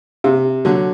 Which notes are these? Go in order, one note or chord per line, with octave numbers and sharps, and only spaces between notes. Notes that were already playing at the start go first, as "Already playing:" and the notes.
C3
D3 F#3